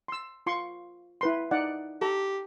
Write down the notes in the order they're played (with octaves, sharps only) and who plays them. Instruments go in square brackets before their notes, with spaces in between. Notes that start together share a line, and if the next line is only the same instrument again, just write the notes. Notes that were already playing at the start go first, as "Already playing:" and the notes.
[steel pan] C6 E6
F4 C6 C#6
E4 B4 C6
D#4 D5 F#5
[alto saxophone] G4 [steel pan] A4 A#5